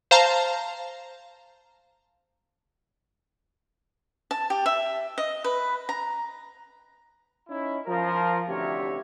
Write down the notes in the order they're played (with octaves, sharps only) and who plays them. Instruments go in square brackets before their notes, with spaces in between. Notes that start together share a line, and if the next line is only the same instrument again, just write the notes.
[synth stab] C5 F5 A5 A#5
[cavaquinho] A5
G4
E5
D#5
B4
A#5
[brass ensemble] C#4 D#4 E4
F3 A#4
A1 D2 C3 G4 C#5 E5